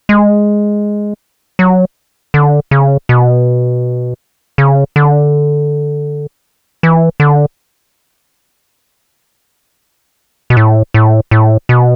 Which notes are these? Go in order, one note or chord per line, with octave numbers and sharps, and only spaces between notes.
G#3
F#3
D3
C#3
B2
C#3
D3
E3
D3
B2
A2
A2
A2
B2